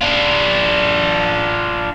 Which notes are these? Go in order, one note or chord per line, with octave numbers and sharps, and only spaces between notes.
D4 F4